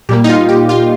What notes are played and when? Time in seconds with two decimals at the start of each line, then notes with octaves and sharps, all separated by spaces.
0.09 A#2 G3 A#3 G4
0.24 D#4
0.29 F4
0.49 G4
0.69 F4